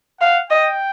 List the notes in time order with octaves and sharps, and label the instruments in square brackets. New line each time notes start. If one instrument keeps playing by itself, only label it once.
[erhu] F5 [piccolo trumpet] F#5
[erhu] D#5 [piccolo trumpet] G5